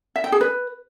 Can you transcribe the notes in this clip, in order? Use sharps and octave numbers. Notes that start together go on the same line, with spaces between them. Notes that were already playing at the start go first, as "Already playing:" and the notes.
E5
G5
G#4
B4